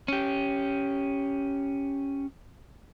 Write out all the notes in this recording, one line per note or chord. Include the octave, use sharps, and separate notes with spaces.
C#4 G4